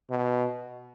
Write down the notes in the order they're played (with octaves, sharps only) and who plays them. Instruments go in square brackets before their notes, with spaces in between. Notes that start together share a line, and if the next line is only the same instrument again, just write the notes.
[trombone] B2